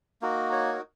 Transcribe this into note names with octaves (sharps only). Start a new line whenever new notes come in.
A#3 D#4 F#4 A#4
C#5
A#4